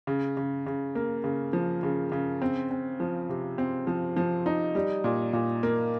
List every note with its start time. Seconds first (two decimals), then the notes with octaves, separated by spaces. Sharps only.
0.07 C#3
0.37 C#3
0.66 C#3
0.95 A#3
1.24 C#3
1.53 F3
1.83 C#3
2.12 C#3
2.42 C4
2.71 C4
3.00 F3
3.29 C3
3.58 C4
3.87 F3
4.16 F3
4.46 D#4
4.75 G3
5.04 A#2
5.33 A#2
5.63 A#3